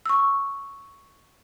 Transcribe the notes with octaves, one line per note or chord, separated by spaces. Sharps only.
C#6 E6